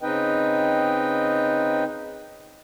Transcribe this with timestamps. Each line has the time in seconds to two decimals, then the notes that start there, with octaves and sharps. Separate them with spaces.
0.01 C#3 C4 D#4 B4 D#5 G5